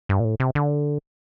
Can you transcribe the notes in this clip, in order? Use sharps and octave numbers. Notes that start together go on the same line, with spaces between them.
G2
A#2
A2
C3
D3